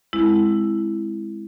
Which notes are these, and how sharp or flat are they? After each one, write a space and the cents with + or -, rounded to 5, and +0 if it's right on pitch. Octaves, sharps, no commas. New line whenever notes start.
G#3 +0 C4 +0 E4 +0